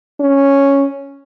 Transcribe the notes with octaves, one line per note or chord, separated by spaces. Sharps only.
C#4